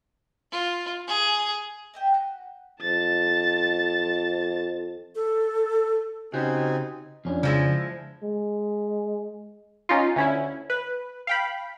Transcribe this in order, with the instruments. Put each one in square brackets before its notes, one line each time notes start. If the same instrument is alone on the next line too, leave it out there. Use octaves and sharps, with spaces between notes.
[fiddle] F4
G#4
[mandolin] D#5 E5 G5
F#4
[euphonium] F2 [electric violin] A5 A6
[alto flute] A4
[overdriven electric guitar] C#3 [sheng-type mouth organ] C4 G#5 [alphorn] D#4 [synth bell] F#4 G4
[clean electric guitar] F2 C#4 D4
[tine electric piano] C#3 [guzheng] F3 G#3 E4
[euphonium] G#3
[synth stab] C#4 D#4 F4
D2 C#4 E4
B4
F5 G5 B5